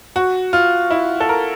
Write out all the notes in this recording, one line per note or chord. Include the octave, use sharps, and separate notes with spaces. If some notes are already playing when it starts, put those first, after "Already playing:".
F#4
F4
E4
A4
A#4